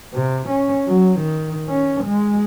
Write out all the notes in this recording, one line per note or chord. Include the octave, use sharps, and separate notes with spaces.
C3
C#4
F#3
D#3
C#4
G#3